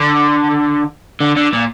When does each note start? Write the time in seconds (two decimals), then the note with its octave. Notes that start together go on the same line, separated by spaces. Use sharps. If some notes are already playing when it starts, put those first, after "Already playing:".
Already playing: D3
1.20 D3
1.36 D3
1.53 A#2